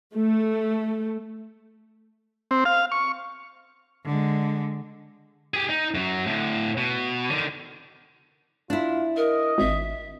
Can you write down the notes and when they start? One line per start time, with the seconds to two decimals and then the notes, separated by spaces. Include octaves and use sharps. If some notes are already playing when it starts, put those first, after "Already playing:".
0.16 A3
2.51 C4
2.65 F5
2.92 C#6
4.05 D3 G#3
5.54 G4 G#4
5.69 D#4
5.95 F#2 F#3
6.27 A2 D3
6.77 B2
7.30 D3 D#3
8.70 D4 E4 F4
9.17 A#4 D#5
9.58 G#1 E5